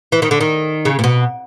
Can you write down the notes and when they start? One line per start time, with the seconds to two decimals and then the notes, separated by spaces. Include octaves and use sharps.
0.12 E3
0.22 D#3
0.31 D3
0.41 D#3
0.85 C#3
0.99 A#2
1.04 B2